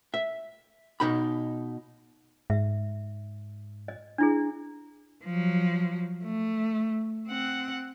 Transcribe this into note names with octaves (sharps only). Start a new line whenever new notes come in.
E5
B2 D#4 B5
G#2 E5
D#5
D4 E4 G#4
F3 F#3
A3
C4 F#5